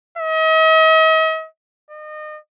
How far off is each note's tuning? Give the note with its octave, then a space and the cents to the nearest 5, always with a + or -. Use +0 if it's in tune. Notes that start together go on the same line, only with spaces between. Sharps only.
D#5 +45
D#5 -30